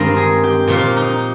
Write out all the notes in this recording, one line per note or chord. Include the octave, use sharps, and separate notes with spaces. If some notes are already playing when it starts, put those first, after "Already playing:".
Already playing: G2 D#3 G#3 C4 D#4 F4 A#4
G#4
G4
A#2 F3 A#3 F4
D#4